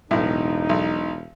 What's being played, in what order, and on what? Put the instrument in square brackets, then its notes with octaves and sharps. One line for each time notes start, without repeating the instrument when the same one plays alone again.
[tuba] E1 [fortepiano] B1 A2 [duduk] D#4
[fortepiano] B1